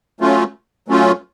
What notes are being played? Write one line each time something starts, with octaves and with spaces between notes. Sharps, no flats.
F#3 A3 C#4 F4
F#3 A3 C#4 F4